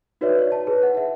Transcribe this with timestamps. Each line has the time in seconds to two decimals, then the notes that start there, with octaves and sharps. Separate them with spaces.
0.21 D#4 F#4 B4 C#5 D5 E5
0.39 C#5
0.52 A5
0.67 G#4 B4
0.83 F#5
0.95 E5 F#5